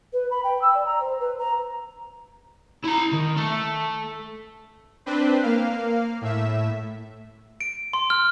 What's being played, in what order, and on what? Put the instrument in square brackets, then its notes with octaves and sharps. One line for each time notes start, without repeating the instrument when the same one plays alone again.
[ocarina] B4
B5
G5
E6
D5
A#5
C5
B4
A#5
[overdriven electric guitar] E4 A#5
D#3
A3
[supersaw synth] C4 D4 B4 C5
A#3 F5
A2 E5
[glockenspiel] D7
C6
F6